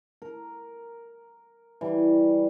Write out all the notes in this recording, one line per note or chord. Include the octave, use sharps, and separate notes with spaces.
A#4
E3 G3